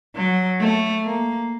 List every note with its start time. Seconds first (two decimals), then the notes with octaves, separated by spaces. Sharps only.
0.16 F#3
0.61 A3
1.05 A#3